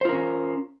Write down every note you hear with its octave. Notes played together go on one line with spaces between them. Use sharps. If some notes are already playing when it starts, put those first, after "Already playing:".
C#4 F4 A#4 C5